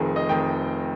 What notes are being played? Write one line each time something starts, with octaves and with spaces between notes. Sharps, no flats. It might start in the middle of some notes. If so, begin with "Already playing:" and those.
Already playing: F1 F2 D#3 G#4
D#5
F1 F2 D#3 G5